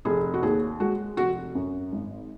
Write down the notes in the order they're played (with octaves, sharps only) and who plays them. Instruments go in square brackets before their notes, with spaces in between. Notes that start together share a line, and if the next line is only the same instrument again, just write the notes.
[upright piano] F1 [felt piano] G#4
[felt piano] F#4
[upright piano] D#2 [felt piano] G#4
[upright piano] G#3 [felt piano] F#4
[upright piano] F1 [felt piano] F#4
[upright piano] F#2
G#1